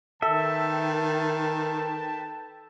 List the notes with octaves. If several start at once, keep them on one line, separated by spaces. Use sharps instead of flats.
D#3 A4 B4 E5 G5 A5